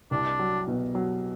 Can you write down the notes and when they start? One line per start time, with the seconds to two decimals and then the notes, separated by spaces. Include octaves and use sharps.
0.11 C2 D4
0.39 F#3
0.67 B2
0.95 F#3